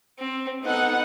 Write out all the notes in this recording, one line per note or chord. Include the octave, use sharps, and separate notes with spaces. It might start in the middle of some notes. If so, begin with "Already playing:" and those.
C4
B3 D#4 A4 F#5